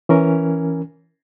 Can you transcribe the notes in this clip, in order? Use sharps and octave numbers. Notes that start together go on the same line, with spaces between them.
E3 C#4 A#4